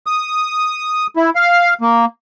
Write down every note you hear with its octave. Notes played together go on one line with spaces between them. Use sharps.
D#6
E4
F5
A#3